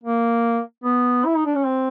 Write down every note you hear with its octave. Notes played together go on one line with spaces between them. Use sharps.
A#3
B3
E4
D#4
D4
C#4
C4